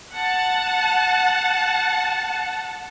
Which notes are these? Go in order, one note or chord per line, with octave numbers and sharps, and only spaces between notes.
F#5 A5